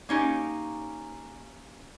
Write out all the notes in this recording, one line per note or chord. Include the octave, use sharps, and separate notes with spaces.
A#3 C#4 D#4 G4